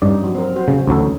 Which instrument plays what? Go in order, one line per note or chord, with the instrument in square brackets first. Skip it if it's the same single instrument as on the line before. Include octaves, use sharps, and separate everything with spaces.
[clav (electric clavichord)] G2 D5 [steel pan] C#4 D#4
[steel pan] F3 F#3
C4 A#4
F#4 C5
[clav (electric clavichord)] C#3 [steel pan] C#4
[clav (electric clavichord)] D2 F#3 A4 [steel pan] E3 C#4 D#4